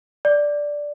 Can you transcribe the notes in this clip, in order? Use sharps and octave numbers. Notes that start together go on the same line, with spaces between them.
D5